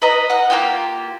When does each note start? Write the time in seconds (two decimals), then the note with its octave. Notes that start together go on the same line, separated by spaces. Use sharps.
0.02 B4 D#5 A#5
0.30 D#5 F#5
0.50 A#3 D4 F4 G4